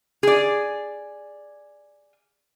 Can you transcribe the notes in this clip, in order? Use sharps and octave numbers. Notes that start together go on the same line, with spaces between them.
G#4 D5